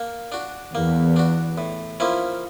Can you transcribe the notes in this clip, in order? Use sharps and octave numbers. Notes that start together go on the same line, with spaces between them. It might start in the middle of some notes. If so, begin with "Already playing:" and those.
Already playing: A#3
D4 F#4
E2 A#3
D4 F#4
A2
F3 A#3 C#4 E4